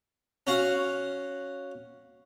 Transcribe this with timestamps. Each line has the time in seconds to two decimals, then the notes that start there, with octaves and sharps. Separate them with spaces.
0.47 C#4 F#4 F5 F#5